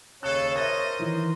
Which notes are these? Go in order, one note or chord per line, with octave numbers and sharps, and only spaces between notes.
D#2 C#3 C#4 G#4 A4 C#5 F#6
A#4 C5 D#5 E5 A6
D#3 E3